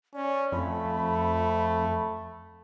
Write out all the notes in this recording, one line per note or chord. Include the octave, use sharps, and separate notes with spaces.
C#4 D5
F2 A3 B5